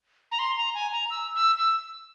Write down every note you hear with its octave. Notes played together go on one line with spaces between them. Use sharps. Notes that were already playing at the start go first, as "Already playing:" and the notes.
A#5
C6
A#5
G#5
A#5
E6
E6
E6